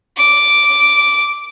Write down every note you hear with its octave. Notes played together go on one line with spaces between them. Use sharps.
D6